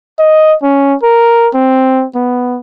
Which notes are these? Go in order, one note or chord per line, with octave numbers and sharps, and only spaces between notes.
D#5
C#4
A#4
C4
B3